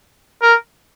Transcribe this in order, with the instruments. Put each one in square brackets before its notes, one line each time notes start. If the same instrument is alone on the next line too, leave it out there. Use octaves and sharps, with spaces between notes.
[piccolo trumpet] A#4